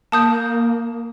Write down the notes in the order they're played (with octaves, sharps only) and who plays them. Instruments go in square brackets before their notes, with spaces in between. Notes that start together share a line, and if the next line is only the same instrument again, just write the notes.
[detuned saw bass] A#3 [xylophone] A5 D#6 G6